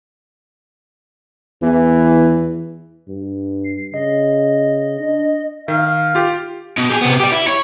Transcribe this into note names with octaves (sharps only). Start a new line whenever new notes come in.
E2 E3
G2
C7
C#3 D#5
D4
D#3 F5
F4 G4
B2
G4 G#4
C3 B3
G4 D5
E4
C#5